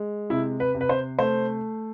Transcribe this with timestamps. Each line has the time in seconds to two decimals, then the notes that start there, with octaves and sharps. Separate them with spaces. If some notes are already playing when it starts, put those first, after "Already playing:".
Already playing: G#3
0.30 C3 E4
0.60 B4
0.75 C3
0.81 B4
0.89 C5
1.18 A3 C5